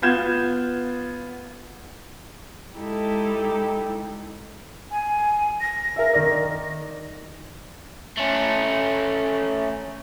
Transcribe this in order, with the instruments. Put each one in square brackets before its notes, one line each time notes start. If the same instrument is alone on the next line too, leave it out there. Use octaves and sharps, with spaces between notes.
[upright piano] B3 F4 G6 G#6 E7
[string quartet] G#3 D#4 E4 G4 A4
[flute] G#5
A#6
[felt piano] A#4 E5
D#3 D5
[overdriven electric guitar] A3 C#4